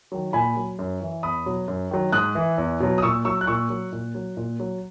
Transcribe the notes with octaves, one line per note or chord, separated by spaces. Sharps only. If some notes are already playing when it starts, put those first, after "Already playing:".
D#3 F#3
A#2 G#5 B5
F#3
F#2
E3
E2 B5 D#6
B2 F#3
F#2
D#3 F#3
G#2 D#6 F#6
E3
E2
B2 F#3
D#6
A#2 C#6 E6
F#3 C#6 E6
F#6
A#2 C#6 E6
F#3
A#2
F#3
A#2
F#3